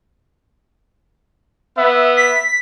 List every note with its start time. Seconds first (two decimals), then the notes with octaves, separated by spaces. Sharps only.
1.77 B3 E5
2.17 B6